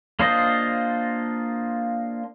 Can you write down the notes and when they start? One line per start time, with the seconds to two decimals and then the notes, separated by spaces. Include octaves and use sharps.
0.20 A#3 D4 F4 C5 D#5